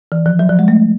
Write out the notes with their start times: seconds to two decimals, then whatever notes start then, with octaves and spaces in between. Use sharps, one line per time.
0.12 E3
0.26 F3
0.39 F#3
0.49 F3
0.59 G#3
0.68 A3